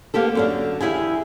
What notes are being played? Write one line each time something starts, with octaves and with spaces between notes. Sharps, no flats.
A#3 B3 G4 A4
F#2 D3 D4
E2 E4 G4 G#4 G#5